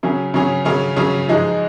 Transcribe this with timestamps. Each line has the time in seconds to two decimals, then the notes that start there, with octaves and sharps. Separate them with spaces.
0.03 C#3 F#3 C#4 G#4
0.34 C#3 F#3 C#4 G#4
0.65 C#3 F#3 C#4 G#4
0.96 C#3 F#3 C#4 G#4
1.29 G#2 F3 G#3 D#4 G#4